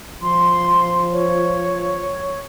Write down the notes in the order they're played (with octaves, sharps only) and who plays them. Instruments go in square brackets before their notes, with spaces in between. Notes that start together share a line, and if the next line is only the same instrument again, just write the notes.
[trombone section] F3 [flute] C6
[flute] C#5